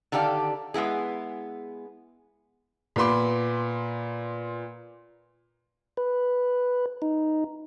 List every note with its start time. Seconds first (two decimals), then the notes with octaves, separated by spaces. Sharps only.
0.12 D3 D#3 G4 A4 D5 F5
0.74 G#3 B3 E4 G#4
2.96 A#2 B3 B5 C6 D6
5.97 B4
7.02 D#4